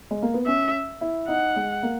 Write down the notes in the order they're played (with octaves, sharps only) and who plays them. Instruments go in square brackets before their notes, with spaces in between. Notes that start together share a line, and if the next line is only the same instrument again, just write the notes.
[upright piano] G#3
A#3
B3
[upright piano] C#4 [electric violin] E5
[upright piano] E4
[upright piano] D#4 [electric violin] F#5
[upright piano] G#3
A#3